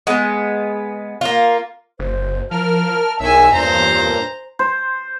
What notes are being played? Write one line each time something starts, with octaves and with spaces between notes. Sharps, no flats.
G#3 B3
A#3 F4
F#1 C5
F3 A#4 A5 F6
B1 E2 D#3 C#5 E5 G#5 E6
E2 G2 A#2 C5 A#5
C5